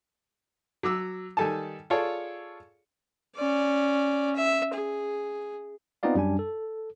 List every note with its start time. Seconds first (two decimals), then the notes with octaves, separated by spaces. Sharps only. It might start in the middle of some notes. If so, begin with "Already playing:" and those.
0.83 F#3 D6 E6
1.37 D#3 G3 A4 G#5 A5
1.90 F4 G#4 A4 C#5 D5
3.36 C#4 D5
4.35 E5
4.74 G#4
6.03 B3 C4 D#4 F4 D5 F5
6.15 F#2 G3 D4 G#5
6.39 A4